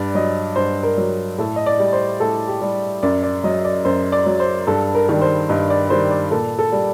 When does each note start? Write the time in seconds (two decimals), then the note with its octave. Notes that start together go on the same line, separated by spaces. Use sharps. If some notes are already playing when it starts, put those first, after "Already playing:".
Already playing: G2 D5
0.15 F#3 D#5
0.56 G2 C5
0.83 A#4
0.97 F#3
1.38 A2 A4
1.56 D#5
1.66 D5
1.79 G3
1.93 C5
2.20 A2 A4
2.48 G4
2.62 G3
3.03 F#2 D5
3.23 D5
3.44 F#3 D#5
3.65 D5
3.85 F#2 C5
4.12 D5
4.26 F#3
4.40 C5
4.67 G2 A4
4.95 A#4
5.09 D#3 G3
5.21 C5
5.49 G2 D#5
5.70 D5
5.90 D#3 G3 C5
6.11 D5
6.31 A#2 A4
6.59 A4
6.72 G3